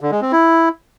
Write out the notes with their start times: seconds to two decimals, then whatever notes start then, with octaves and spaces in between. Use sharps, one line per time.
0.01 D3
0.11 G#3
0.22 C4
0.32 E4